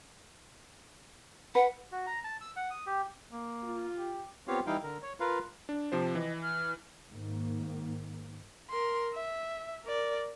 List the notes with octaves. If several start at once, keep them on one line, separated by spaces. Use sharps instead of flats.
B4 F#5
F#4
A#5
A5
E6
F#5
D#6
G4
A#3
F4
G4
B3 C4 F4 G4 C#5 F5
E3 G3 D#4 E4 F5 G5
D3 A#4
C#5
F4 A#4 B4 F5
D4
C3 F3 C5 A5
E3 D#5
F6
G#2 D#3 A#3
A#4 C6
E5
A#4 D5